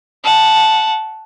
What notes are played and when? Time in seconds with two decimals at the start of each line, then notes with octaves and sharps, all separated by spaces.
0.24 F#5 A5